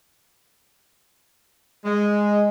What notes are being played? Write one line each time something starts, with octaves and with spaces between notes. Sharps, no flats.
G#3